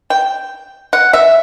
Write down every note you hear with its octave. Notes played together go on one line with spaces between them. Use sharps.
G5
F#5
E5